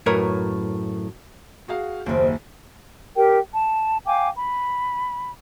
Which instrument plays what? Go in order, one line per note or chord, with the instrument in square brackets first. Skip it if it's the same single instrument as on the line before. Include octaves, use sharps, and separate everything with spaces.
[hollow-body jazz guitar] F#2 A2 A#4 B4 C#5
[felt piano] F#4 G#4 F5
[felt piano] F#1 D#2 [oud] D#3 C4
[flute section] G4 A#4 G5
A5
F5 G5 G#5 D6
B5